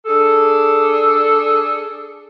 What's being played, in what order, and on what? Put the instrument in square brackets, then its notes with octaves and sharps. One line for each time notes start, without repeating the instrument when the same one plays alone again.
[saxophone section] D4 G#4 A4